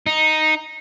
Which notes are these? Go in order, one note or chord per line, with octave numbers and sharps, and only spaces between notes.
D#4